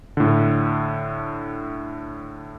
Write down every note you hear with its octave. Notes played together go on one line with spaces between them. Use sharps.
A2 D3